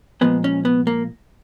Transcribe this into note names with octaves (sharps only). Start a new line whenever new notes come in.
A#2 F3 G#3 B3
C#4
B3
A#3